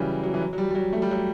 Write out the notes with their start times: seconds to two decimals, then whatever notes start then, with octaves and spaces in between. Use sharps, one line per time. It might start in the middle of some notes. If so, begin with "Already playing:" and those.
Already playing: C#3 E3 F#3 G3
0.23 F#3
0.34 E3
0.41 F#3
0.53 F#3
0.58 G3
0.70 G3
0.75 F#3
0.93 A3
1.02 G3
1.11 F#3